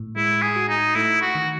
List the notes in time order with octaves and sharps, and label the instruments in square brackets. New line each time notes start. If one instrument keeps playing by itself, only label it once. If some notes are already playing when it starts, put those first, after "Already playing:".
Already playing: [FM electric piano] A2
[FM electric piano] G#3 [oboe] E4
[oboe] G#4
[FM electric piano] F#4
[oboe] D#4
[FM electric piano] A3 [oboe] E4
[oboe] F#4
[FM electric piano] D#3